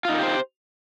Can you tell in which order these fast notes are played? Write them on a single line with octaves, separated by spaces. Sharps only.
F4 D#4 A#4 G4 C5